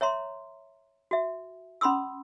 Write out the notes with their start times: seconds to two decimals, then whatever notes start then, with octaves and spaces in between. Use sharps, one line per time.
0.01 C#5 E5 A#5 C6
1.11 F#4 E5
1.81 C#4 B5 C6 D#6 E6